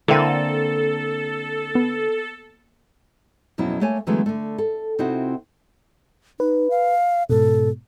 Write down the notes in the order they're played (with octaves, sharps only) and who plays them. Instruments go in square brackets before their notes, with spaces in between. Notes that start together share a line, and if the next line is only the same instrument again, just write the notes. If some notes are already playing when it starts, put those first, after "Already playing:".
[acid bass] D3 [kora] A#3 C4 [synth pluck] E4 E5 D#7 [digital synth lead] A4
[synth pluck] B3
[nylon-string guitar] F2 B2 F#3 C#4 E4
A3 A#3 C#5 G#5
D3 E3 F#3 G#3 A3 B3
D3 A3
A4
C3 C4 D#4 E4 F#4
[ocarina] D#4 [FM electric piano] B4
[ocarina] F5
[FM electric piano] G#2 B2 [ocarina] A4